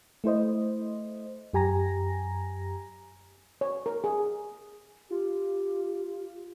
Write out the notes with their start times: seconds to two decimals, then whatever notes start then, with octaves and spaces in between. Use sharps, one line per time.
0.24 A3 E4 C5 D#5
1.53 F#2 G4 G#5 A#5 A#6
3.61 C#5
3.86 A#4
4.04 G#4
5.11 F4 G4